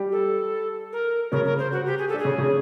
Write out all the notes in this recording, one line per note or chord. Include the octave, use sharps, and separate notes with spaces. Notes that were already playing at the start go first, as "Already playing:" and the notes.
Already playing: G3 G4
A4
A#4
C#3 C#4 A#4
A#4
C5
F#4
G4
G#4
A4
D4 G#4
C#3 C#4
C#3 C#4